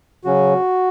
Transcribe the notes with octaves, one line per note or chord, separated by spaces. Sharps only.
C#3 F#3 C#4 F#4